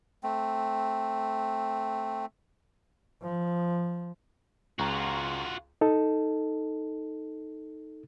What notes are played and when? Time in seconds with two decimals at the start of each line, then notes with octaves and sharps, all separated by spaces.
0.23 A3 C4
3.22 F3
4.79 C#2 F4 F#4 A#5
5.81 D#4 A4